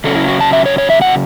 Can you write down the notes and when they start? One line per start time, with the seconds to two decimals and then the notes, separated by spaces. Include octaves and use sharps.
0.04 C#3 F#3 C#4 A4
0.16 E4
0.28 F#4
0.41 A5
0.53 E5
0.66 C#5
0.78 C#5
0.90 E5
1.02 F#5